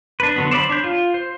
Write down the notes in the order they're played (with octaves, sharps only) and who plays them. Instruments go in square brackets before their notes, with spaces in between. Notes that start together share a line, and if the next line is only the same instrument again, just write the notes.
[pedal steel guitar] D4 B4
D3 F#3 B3
C5 D5 E5 B5
D4 C#5 G6
F4
C5